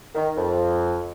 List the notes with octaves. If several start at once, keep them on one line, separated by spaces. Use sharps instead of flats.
D#3
F2